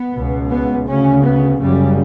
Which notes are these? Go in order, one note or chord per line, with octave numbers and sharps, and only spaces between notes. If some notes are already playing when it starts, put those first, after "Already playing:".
Already playing: B3
C#2 B2
B3
D2 C#3 C#4
B3
F#1 F#2 C#3 G3